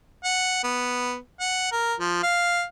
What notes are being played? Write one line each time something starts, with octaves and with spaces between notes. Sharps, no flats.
F#5
B3
F#5
A#4
F3
F5